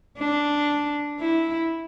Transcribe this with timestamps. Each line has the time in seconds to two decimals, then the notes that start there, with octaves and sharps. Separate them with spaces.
0.18 D4
1.19 E4